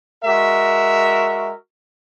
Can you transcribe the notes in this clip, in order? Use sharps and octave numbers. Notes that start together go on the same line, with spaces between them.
G#3 F#4 A#4 E5